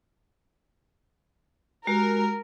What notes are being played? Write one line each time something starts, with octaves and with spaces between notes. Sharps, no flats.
G#3 F#4 G4 A#4